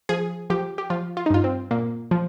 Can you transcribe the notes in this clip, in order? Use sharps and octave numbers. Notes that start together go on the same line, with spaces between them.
F3 G#4
F3 G4
G4
F3 F4
F4
D#4
G2 F4
C4
A#2 A#3
F3